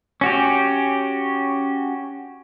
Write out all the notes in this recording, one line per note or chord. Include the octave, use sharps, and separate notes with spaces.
C#4 F#4 G4